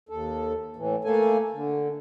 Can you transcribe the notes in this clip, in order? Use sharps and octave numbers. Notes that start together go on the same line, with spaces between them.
D#2 A4
A2 E3
A3 A#3 A4 G#5
D3